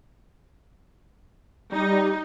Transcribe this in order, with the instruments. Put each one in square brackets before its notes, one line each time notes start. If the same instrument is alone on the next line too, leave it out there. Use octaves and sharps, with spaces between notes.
[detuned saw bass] G3 [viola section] D#4